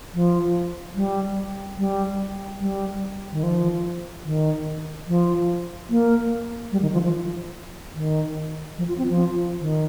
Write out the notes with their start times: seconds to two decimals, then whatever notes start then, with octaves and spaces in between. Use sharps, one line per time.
0.14 F3
0.95 G3
1.78 G3
2.60 G3
3.32 D#3
3.43 F3
4.25 D#3
5.08 F3
5.90 A#3
6.72 G3
6.82 D#3
6.93 F3
7.03 F3
7.95 D#3
8.78 F3
8.88 F4
8.98 C4
9.09 F3
9.60 D#3